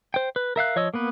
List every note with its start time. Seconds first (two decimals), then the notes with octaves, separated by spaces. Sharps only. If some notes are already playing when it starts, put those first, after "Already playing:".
0.14 C5 G5
0.36 B4
0.56 A#4 E5 F5 F#6
0.76 F3 C#5 D#5 E6
0.94 A#3 B3 B4